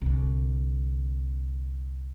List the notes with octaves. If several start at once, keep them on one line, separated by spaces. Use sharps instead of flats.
C2 D3